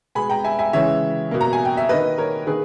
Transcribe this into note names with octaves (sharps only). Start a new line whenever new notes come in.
B2 G#3 B3 G#5 B5
G5 A#5
E5 G#5
E5 G#5
C#3 E3 G#3 C#5 E5
B2 A#3
A#5
G#5
G5
E5
D#3 A#3 B4 D#5
A#4 C#5
D#3 A#3 G#4 B4